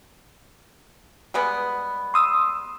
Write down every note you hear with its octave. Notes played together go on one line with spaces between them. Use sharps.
G3 G#3 B3
C6 D#6 E6